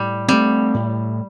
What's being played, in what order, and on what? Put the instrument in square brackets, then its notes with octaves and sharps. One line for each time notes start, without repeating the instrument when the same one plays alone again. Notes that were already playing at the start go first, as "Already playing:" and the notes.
Already playing: [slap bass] A2 [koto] G3
[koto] G3 [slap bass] A3 C4
[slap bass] A2